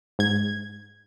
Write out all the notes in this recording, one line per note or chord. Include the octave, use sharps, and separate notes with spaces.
G#2 G#6